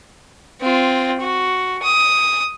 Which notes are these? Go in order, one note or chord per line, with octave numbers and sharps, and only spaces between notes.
C4 F4
F#4
D#6